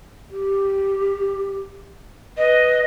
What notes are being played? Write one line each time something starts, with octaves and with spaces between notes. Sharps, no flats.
G4
B4 D#5